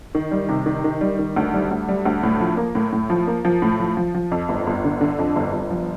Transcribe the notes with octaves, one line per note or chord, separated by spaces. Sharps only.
D#3
G3
C3
D#3
D#3
G3
D#3
D2
G3
D2
G3
D2
A2
F3
A#3
A2
A2
F3
A#3
F3
A2
F3
F3
F3
F2
G1
G1
D3
D3
F2
G1
G1
F3